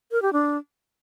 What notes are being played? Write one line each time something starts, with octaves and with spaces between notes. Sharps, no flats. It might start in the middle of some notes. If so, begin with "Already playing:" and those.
A#4
G4
D4